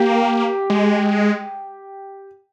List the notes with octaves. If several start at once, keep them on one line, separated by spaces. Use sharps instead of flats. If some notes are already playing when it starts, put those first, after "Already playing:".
Already playing: A#3 G4
G#3